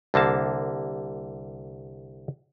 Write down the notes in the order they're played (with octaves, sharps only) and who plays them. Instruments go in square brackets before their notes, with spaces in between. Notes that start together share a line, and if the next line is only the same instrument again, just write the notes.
[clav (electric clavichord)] C2 D3 A#3 A5